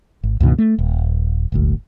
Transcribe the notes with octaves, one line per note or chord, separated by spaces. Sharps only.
G#1
C#2 G2 B2 D#3
A3
D#1
D#1 G#1 D2